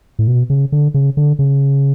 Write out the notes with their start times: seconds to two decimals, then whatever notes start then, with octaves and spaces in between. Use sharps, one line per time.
0.19 A2
0.28 B2
0.50 C#3
0.72 D3
0.94 C#3
1.17 D3
1.39 C#3